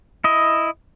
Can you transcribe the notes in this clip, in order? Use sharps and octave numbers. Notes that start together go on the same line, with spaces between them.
E4 D#5